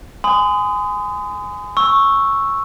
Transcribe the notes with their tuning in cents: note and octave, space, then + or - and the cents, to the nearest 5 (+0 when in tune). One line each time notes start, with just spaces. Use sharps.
G#5 +0 C6 -45 D#6 +0
C#6 -5 E6 +0